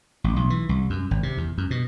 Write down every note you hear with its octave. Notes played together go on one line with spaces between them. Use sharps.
A1
B1
E3
C2
F#2
G#1
C3
E2
F#2
B2